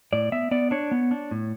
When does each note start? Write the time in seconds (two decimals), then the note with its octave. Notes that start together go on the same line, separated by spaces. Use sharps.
0.13 A2 D5
0.32 B3 E5
0.51 B3 D5
0.71 D4 C#5
0.91 B3
1.11 D4
1.31 A2